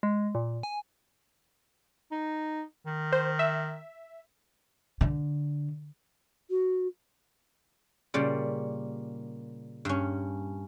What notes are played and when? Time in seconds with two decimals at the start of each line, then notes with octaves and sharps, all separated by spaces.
0.03 G#3
0.35 A#2
0.63 G#5
2.12 D#4
2.86 D#3
3.12 C5
3.39 E5
5.01 D3
6.50 F#4
8.14 A#2 C#3 G3
9.85 G2 C#4